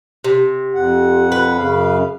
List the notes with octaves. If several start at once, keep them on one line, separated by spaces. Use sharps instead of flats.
C3
F2 F#5
B4
F#2 C#3 F5